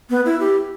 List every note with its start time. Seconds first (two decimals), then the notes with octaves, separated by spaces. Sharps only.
0.10 B3
0.25 E4
0.40 G4